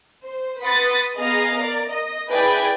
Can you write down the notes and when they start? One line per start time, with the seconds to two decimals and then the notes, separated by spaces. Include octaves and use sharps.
0.24 C5
0.62 B4 F#5 B5 C6 D#6 A6
1.16 B3 G#4 D#5 F5 A#5
1.57 A#4 D5
1.90 D#5
2.29 E4 G#4 B4 D5 G5 G#5